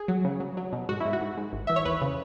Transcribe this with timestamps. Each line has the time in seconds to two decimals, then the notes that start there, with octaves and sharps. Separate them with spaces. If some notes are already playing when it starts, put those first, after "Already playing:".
Already playing: G#4
0.08 F#3
0.25 C#3
0.40 F#3
0.57 F#3
0.72 B2
0.89 G#2 F#4
1.00 E4
1.05 G#2
1.13 F#4
1.21 G#2
1.37 G#2
1.53 G#1
1.67 E3 E5
1.76 C#5
1.85 E2 B4
2.01 C#3